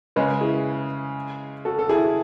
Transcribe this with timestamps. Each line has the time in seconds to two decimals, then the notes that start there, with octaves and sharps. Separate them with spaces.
0.16 C#3 G#3 C#4 B4 D#5
0.41 E4 G#4
1.65 F#4 A4
1.79 A4
1.89 E4 G#4